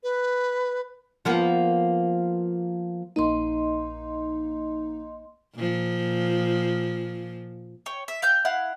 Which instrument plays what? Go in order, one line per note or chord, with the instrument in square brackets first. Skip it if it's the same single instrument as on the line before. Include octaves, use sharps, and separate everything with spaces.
[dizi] B4
[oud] F3 A#3 B3
[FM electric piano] A#1 A#3 D#4 [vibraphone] D#5 C6
[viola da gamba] A#2 F3
[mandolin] C#5 G5
E5
F5 G5 G6
E4 F5 F#5